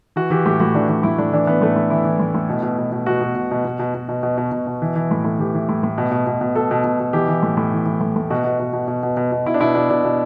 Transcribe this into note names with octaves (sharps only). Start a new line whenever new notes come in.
E3 F#4
E3 G4
A2 G4
A2 F#4
E3 D4
E3 D4
A2 E4
A2 D4
E3 D4
E3 B3
A2 A3
A2
E3 E4
E3
A2
A2
B2
B2
B2
B2
B2 F#4
B2
B2
B2
B2
B2
B2
B2
B2
B2
B2
B2
E3
E3
A2
A2
E3 G4
E3
A2
A2
B2
B2
B2
B2
B2 A4
B2
B2
B2
E3 G4
E3
A2
A2
E3
E3
A2
A2
B2 F#4
B2
B2
B2
B2
B2
B2
B2
B2 E4
D4
B2 E4
B2 D4
B2 D4
B2